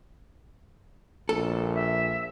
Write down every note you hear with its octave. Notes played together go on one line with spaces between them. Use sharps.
A#1 A4
E5